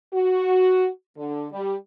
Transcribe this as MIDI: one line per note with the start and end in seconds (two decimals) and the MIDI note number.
0.14 0.89 66
1.18 1.47 50
1.53 1.75 55